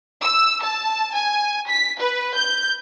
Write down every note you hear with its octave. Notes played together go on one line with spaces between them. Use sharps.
E6
A5
G#5
B6
B4
G6